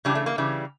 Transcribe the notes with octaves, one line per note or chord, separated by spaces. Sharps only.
C#3 E3 G3 D4
A3
A#3
C#3 E3 G3